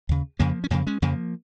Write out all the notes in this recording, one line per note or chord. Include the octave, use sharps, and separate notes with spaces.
D#2 C#3
F2 C#3 F3 A#3
C#4
F2 C#3 F3 A#3
G#3 C#4
F2 C#3 F3 A#3